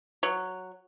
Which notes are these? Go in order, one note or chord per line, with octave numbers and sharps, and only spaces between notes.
F#3